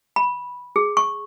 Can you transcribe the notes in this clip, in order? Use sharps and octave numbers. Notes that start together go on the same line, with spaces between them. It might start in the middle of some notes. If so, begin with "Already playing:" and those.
B5
G#4
C#6